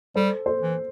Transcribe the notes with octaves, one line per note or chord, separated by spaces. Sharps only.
G3 A4 C5
A4 C5
E3